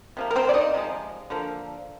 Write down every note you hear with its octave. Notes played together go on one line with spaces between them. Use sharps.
C3 F3 A#3
A#4
C4 C5
D5
D#4 D#5
C3 F3 G#3
D3 F3 A#3